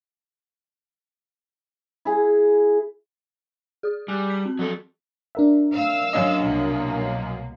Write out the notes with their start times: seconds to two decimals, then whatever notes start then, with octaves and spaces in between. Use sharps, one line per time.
2.05 E4 G#4
3.83 G#4 D#6
4.08 G3 G#5 E6 F#6
4.30 A5 B6
4.45 C4
4.59 F3 F#3 A4
5.35 D4 A#4 E5
5.73 F5 E6
6.13 F#2 C#4 D#5
6.42 C2 B2 A#3